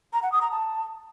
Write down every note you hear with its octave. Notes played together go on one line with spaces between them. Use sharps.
A#5
F#5
D#6
A#5
A5